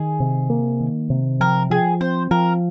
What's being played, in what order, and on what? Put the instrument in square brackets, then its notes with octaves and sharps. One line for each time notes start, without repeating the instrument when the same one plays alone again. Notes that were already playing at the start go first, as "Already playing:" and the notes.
Already playing: [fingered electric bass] D#3 [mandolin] G#4
[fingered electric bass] C3
A#3
D#3
C3
[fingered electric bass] F3 [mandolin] A#4
[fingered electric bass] F3 [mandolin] G#4
[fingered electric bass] C4 [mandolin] C5
[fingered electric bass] F3 [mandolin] A#4